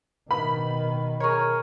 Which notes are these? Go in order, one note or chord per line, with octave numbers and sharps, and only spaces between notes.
B2 D#3 B5
G#4 A#4 C#5